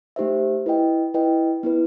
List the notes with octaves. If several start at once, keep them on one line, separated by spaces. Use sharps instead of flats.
A3 D#4 G4 C5 E5
E4 B4 D#5 G5
E4 B4 D#5 G5
B3 E4 B4